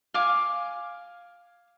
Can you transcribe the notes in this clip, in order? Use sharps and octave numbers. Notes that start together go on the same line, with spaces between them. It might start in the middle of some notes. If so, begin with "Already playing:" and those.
F5 G#5 D6